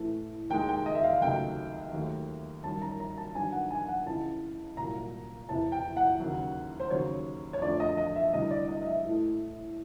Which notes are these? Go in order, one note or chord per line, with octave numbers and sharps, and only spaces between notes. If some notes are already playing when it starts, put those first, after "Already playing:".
Already playing: A2 E3 A3
D#2 D#3 G#3 G5
G5
D#5
E5
F5
C#2 C3 D#3 F#3 A3 G5
D#2 D#3 F#3 A3
F#2 D#3 G3 A5
A#5
A#5
A5
G2 D#3 F#3 G#5
F#5
G#5
F#5
C#2 C#3 E3 A5
C2 A#2 F#3 A#5
E2 C3 E3 A5
G5
F#5
D#2 C#3 F#3
C5
D#2 C#3 F#3 C#5
C#5
F2 D3 F3 A3 D5
D#5
D#5
E5
D2 C3 E3 G3 D#5
D5
D#5
D#5
E5
A2 E3 A3